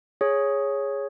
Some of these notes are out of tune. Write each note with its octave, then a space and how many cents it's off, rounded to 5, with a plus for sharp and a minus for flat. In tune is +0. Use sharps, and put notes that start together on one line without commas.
G#4 +0 C#5 +0